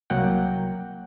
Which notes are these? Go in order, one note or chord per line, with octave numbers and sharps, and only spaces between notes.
C2 F#3 A#3 F#5 G5